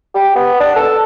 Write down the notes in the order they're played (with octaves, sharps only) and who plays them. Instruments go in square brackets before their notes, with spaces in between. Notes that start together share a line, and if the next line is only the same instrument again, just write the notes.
[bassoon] G4
B3
D4
A4